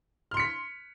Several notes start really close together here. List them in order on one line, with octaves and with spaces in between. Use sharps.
F6 C6 C#7 B6